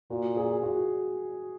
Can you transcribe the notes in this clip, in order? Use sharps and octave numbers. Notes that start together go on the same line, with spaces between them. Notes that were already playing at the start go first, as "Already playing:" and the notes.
A#2 F#4
G#4
F#4